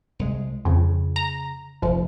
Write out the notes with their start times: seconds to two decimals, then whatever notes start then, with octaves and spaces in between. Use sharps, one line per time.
0.19 C2 G#3
0.65 F2 C#3
1.16 A#5
1.82 F1 F3